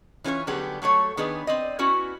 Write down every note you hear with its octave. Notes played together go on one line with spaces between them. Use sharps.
E3 C#4 F4 G4 C#5
D3 F#3 G3 B3 G4 G#4
F#3 A3 A4 C#5
D#3 B3 D4 G#4 B4
C4 D5 D#5
B3 C#4 E4 F#4